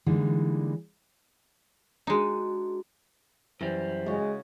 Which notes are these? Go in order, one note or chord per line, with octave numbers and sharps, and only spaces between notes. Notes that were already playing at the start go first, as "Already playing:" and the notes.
D3 E3 G3 G#3 A#3 D#4
G#3 D4 D#4 F#4
F#2 E3 G3 C5
C#3 G#3 F#4